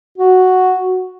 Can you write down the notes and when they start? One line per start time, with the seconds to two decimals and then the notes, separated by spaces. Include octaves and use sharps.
0.18 F#4